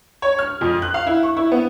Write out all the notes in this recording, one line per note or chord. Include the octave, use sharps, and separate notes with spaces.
C#5
F6
F2
F#6
F5
E4
C#6
E4
B3